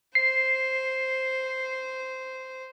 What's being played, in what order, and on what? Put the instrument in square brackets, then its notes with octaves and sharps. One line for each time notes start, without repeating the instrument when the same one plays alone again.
[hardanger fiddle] C5 [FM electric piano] C7